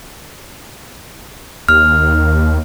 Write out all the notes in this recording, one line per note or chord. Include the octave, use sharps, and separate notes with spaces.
D#2 F6